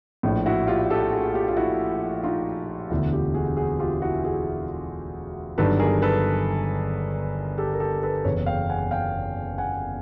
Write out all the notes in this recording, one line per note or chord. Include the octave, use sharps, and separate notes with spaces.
A#1 A2 F3
E4 F#4
F4 G4
G4 A4
F#4 G#4
F4 G4
F4
E4 F#4
D#4 F4
E1 D2 D3 E4 F#4
F4 G4
F#4 G#4
F#4 G#4
F4 G4
E4 F#4
F#4 G#4
G1 G2 D#3 F#3 A4 B4
G#4 A#4
A4 B4
G4 A4
A#4
G4 A4
A4 B4
F#1 E2 C#3 B4 C#5
F5 G5
F#5 G#5
F5 G5
F#5 G#5